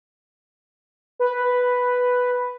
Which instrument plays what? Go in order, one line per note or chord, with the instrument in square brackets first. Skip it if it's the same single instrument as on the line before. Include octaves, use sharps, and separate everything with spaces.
[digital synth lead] B4